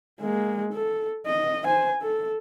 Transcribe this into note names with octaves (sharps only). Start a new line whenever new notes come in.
G#3 A#3
A4
D#5
C5 G#5
A4